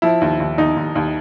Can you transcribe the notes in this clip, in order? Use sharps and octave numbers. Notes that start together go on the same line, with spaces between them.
F3 E4
D#2
D#2
D#2 D#4
D#2
D#2